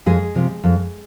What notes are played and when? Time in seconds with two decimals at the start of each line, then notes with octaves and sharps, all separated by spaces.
0.06 F2 G#3 G#4
0.35 C3 F3
0.64 F2